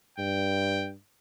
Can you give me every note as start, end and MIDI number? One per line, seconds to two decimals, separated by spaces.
0.18 0.93 43
0.18 0.90 79